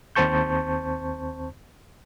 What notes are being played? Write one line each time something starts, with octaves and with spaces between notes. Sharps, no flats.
D#2 C4 C5 A5 C#6 G6